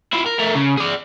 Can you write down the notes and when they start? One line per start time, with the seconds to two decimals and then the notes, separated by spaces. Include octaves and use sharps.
0.13 E4 F4
0.26 A#4
0.39 A3 A#4
0.55 C#3
0.78 G#4 D5